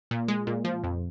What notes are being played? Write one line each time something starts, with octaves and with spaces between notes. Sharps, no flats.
A#2
G#3
A#2
F3
F2